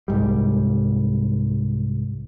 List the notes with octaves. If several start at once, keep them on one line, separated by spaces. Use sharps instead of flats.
C2 G#2 G3